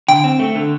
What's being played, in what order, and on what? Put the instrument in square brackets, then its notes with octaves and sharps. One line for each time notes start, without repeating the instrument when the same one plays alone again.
[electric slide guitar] D3 [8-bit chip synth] G5
[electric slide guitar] C4
A3
D3